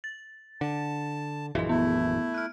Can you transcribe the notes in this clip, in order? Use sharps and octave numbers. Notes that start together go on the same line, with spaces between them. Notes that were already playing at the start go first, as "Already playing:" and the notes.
A6
D3 A5
A#1 F#2 E3 G#4 D#5
A3 B3 E4
F6 F#6